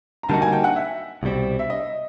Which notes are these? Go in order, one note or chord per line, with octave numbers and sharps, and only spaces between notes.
A#5
D3 G3 A#3 D#4 F#4 A5
G#5
G5
F#5
E5
C2 B2 G3 C4
E5
D#5